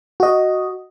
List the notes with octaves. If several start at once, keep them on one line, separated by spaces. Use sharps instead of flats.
F#4 D#5